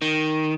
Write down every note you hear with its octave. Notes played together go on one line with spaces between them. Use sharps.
D#3